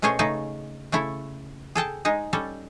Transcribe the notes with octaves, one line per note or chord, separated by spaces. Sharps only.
B2 A3 C#4 G#4 C5 C#5
C#3 A3 D#4 G#4
C#3 A3 E4 C#5
G#4 A4 G5 A5
G#3 D#4 G#4
G3 C#4 A4